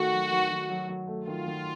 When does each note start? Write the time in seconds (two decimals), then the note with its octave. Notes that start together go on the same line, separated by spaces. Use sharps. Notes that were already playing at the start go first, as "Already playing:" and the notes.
Already playing: D#3 A3 F#4
0.13 F#3
0.31 D#3
0.51 D#3
0.70 F#3
0.88 F#3
1.07 A3
1.27 D#3 F4
1.46 D#3